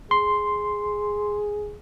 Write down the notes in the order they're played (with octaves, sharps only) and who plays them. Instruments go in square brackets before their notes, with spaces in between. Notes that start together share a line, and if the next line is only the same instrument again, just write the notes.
[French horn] G#4 [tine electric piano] C6